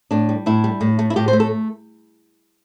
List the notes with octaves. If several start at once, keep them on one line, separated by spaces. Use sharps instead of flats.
A2 D4
G3
A2 E4
G3
A2
A3
E4
A2 G4
C5
A3
A4